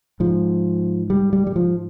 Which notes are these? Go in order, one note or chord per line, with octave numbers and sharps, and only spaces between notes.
G#2 F3
G3
G3
G3
F3